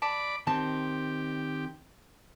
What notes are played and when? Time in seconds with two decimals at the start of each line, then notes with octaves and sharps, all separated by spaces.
0.02 D5 A5 B5 D6
0.47 D#3 C4 G4 A5